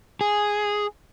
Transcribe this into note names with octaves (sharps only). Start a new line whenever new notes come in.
G#4